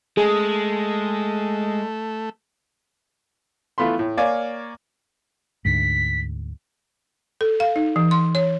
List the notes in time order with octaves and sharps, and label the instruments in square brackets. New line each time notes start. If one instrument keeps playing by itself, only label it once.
[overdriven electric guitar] G#3 [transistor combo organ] A3 [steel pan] G#4
[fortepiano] E3 A3 B3 F4 B5 C6
A2
A#3 C#5 D5 F5 G#5
[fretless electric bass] D2 G#2 [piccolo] B6
[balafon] A4
F5
D#4
E3
C6
C#5